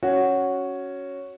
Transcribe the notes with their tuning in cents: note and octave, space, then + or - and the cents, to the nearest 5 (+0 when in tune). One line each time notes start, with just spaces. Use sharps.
C#4 +0 F#4 +0